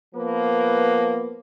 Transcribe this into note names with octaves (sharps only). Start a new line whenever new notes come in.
F3 A#3 B3 B4